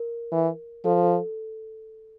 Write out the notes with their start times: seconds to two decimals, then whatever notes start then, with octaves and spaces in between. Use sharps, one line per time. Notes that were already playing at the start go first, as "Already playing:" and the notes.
Already playing: A#4
0.32 E3
0.85 F3 A4
1.03 A4